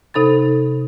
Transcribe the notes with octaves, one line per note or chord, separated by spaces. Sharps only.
C3 D#4 A4 B5 A6